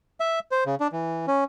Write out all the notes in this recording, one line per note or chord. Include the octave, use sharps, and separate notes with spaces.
E5
C5
C#3
D4
E3
C#4